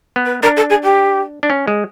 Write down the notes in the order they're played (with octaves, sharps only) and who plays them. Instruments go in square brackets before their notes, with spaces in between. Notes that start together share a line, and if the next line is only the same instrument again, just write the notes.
[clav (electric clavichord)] B3
[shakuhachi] B4
[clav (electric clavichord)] D4 [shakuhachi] A#4
[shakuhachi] A4
G#4
G4
[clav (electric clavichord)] D4
C#4
G#3